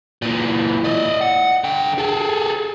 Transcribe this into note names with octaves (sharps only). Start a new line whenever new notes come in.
A#2 E3
D5 D#5
F#5
D3 G5
G#4 A4